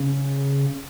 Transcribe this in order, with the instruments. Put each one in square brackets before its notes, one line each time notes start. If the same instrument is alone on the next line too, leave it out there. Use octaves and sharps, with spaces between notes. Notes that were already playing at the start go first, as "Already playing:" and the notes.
Already playing: [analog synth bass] C#3